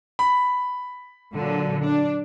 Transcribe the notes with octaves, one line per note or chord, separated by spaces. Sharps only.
B5
A#2 D3 F#3
D4